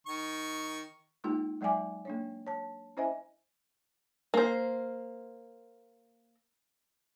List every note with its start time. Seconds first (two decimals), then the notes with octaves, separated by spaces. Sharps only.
0.07 D#3 C#6
1.24 G#3 A#3 D#4 F4 G4
1.61 F#3 G#3 D5 E5 G#5 D6
2.05 A#3 D4 C#5
2.47 C#5 A5
2.97 C#4 E4 C5 D#5 E5 G#5
4.34 A#3 C5